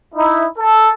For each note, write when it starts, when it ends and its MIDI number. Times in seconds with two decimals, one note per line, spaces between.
0.15 0.44 63
0.15 0.44 64
0.59 0.92 69